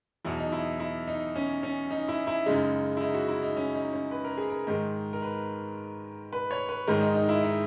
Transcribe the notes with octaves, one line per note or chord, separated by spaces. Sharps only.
E2 B2 F#3 E4
D#4
E4
E4
D#4
C#4
C#4
D#4
E4
E4
F#2 C#3 G#3 D#4
E4
D#4
F#4
E4
D#4
C#4
D#4
C#4
B4
A#4
G#4
A#4
G#2 D#3 G#3
A#4
B4
B4
C#5
B4
G#2 D#3 G#3 A#4
D#4
D#4
E4
D#4